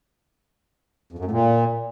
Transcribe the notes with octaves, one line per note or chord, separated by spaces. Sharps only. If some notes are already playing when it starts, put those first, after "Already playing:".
F2
F#2
A2
A#2